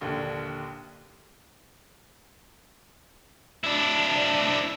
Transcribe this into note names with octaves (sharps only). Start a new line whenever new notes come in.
A#1 D#2 D3
D4 E4